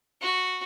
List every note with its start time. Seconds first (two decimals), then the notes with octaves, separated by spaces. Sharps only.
0.21 F#4